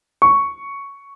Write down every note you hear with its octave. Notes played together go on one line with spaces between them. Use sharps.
C#6